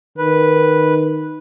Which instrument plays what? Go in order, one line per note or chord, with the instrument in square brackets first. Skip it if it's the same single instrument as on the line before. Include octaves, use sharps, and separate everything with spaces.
[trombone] D#3 [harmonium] B4